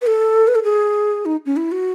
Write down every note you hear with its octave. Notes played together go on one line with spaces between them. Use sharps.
B4
A4
B4
A4
G#4
D#4
C#4
E4
F#4